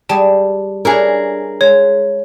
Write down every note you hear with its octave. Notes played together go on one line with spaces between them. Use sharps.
G3 G#4 A5
D4 E4 G#4 A#4 C#5
G#3 C#5